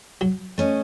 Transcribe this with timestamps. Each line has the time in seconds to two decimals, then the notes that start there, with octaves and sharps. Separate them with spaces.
0.21 F#3
0.58 A3 C#4 D#5